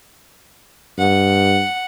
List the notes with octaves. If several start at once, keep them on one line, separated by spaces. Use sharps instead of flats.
G2 F#5